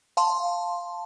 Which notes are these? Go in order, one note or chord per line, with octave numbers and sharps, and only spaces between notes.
F5 A5 C6